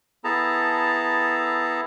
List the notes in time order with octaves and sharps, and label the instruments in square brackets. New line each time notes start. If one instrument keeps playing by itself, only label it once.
[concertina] B3 E4 G#4 A4 A5 A#5